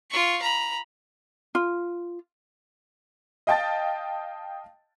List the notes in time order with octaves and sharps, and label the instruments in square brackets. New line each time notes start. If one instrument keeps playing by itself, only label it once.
[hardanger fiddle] F4 C#6
A#5 B5
[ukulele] F4
[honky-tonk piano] D#5 F5 G5 A5 A6